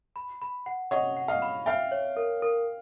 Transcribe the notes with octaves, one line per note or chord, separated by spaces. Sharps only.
B5
B5
F#5
C#5 D#5 F#5
F#5
D#5 F5
B5
E5 F5 G5
C#5
A#4
A#4